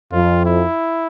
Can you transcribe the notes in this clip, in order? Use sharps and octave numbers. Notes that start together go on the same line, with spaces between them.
F2 F4
E4